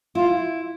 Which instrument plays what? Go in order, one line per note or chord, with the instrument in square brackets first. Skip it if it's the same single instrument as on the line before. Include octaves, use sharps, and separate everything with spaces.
[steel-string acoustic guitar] E4 [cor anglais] F4